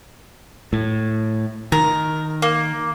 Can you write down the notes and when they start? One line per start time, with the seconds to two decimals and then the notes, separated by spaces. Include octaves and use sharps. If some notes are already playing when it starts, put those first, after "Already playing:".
0.73 A2
1.72 D#3 A#4
2.42 A#3